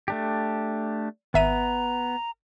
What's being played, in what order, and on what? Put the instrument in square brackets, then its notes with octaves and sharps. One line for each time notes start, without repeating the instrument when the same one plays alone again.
[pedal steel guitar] A3 D4 G4
[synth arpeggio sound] G#1 E5 D#7 [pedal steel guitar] B3 [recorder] A#5